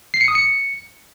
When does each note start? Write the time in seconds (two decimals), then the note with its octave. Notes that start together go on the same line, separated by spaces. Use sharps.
0.14 C7
0.21 C#7
0.28 D#6
0.35 C#7